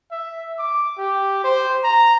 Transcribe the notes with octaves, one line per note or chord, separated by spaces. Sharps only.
E5
D6
G4
C5
A#5